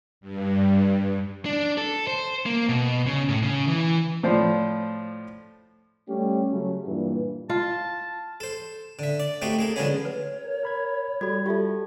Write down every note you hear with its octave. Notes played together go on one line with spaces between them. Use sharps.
G2
D4
A4
C5
A#3
B2
C#3
A2
C#3
E3
A2 F3 C5 D5
G3 A3 C#4 G4
C#3 F#3 A3 C#4
G2 A#2 E3
F4 A5
A4 C5
D3 E5
D5
A3 C4 D#4 F#4 G4
A#3 G#4 A4
D3 F3 F#3 G#3 B3 C#4
B4 C#5
A#4
A#4 B5 G#6
G3 F#4 A4 B5 G#6
D#4 F4 G4 A4 E5